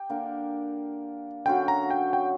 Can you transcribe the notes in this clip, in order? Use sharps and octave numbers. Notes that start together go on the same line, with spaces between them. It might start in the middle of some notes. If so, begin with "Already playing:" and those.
Already playing: G4 G5
D3 A#3 D4 A#4
D3 F#3 C#4 F#4 G5
A#5
G5
G5